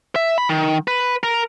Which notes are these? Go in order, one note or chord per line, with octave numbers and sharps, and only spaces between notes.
E5
B5
D#3
B4
A#4